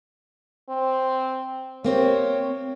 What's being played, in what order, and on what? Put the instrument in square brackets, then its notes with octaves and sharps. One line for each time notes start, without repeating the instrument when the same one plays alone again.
[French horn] C4
[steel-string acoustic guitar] A#3 C4 G4 [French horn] C#5